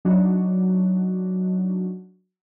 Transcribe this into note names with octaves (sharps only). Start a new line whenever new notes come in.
F#3 D4 D#4 F#4